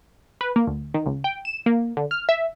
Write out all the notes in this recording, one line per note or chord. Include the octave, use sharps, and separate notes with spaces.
B4
A#3
D2
D#3
C#2
G5
E7
A#3
D3
F6
E5